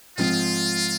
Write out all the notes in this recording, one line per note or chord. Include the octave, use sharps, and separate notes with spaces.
G#2 F3 C4 F4